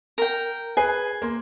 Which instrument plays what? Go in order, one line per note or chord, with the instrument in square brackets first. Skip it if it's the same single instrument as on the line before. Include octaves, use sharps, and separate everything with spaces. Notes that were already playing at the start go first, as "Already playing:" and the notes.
[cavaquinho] A#4 G5
[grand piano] G#4 B4 C7 [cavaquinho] G#5
[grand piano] A#3 C6